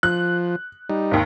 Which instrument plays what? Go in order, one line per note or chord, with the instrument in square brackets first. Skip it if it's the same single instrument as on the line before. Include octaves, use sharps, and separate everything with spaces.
[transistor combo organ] F3 [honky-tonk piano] F#6
[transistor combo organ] G3 D#4
[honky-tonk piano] G#1 D#2